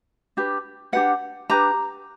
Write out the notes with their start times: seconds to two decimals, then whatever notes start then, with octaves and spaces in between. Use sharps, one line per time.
0.37 D4 G4 B4
0.93 D4 G4 B4 F#5
1.50 D4 G4 B4 A#5